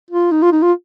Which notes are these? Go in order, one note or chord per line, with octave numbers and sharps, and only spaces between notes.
F4
D#4
F4
D#4
F4